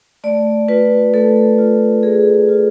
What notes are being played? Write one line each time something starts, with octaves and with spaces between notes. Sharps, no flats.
A3 D5
F4 B4
A3 A4
F4
A3 G#4
F4